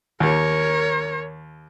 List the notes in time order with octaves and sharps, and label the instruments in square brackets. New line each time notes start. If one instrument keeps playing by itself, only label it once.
[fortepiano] D#2 [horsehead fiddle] A#4 C#5